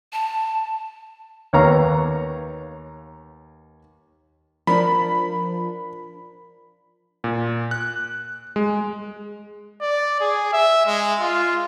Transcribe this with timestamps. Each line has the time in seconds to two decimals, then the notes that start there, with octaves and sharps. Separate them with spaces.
0.13 A5
1.53 D#2 B3 C#5 F5 A#5 C#6
4.67 F3 D4 A#4 D5 B5
7.24 A#2
7.71 F#6
8.56 G#3
9.81 D5
10.21 G#4
10.53 E5
10.86 G#3
11.21 F4